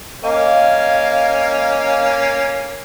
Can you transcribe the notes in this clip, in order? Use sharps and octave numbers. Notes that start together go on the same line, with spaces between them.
A#3 C#4 D#5 F5